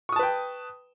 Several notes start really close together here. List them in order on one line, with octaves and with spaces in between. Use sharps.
C#6 D#6 A5 B4 G5